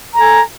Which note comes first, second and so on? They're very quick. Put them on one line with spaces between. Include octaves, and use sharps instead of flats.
A#5 A4 G#5